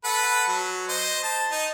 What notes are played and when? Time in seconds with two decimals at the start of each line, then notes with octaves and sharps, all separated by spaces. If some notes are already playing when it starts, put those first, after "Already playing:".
0.04 A4 B4 F#5
0.48 F#3
0.89 C5 D#5
1.23 A5
1.51 D#4